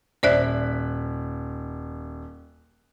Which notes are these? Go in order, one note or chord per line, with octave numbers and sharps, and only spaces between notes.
D#1 C5 D5 E5 F#6 B6